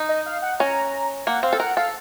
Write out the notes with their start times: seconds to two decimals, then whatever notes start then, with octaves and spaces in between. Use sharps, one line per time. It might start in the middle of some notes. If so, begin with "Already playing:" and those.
Already playing: D#4
0.09 D#5
0.26 F5
0.42 F#5
0.59 C#4 A#5
1.27 A#3 F#5
1.43 C4 F5
1.53 A4
1.60 A#4 F#5
1.77 A4 F5